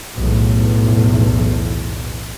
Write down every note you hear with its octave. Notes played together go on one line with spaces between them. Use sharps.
B1 E2 A2